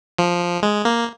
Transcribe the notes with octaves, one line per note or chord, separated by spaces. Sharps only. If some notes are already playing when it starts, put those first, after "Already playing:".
F3
G#3
A#3